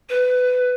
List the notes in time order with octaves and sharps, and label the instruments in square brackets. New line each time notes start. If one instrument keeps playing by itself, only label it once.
[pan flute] B4